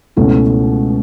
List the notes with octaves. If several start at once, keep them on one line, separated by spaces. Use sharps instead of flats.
C#2 B2 A3 C#4 E4